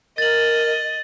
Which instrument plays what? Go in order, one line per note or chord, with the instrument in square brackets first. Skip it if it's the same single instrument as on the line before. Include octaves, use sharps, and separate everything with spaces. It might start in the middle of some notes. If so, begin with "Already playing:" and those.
[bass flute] A#4 [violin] D#5 [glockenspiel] A6 F#7